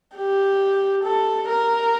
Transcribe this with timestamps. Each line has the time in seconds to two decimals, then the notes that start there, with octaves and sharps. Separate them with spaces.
0.16 G4
1.04 A4
1.48 A#4